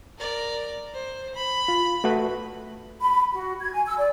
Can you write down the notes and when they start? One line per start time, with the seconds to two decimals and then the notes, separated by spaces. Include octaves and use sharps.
0.18 A#4 D5
0.94 C5
1.35 B5
1.68 F4
2.04 A3 F#4 B4
3.01 B5
3.34 F#4
3.60 G#6
3.74 G#5
3.85 E6
3.98 D5